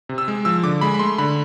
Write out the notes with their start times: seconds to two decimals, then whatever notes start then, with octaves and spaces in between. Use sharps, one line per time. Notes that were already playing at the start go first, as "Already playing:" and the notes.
0.09 C3
0.18 E6
0.28 G#3
0.45 F3 E6
0.63 D3 D6
0.81 G#3 B5
0.94 B5
0.99 A3 C6
1.18 D3 B5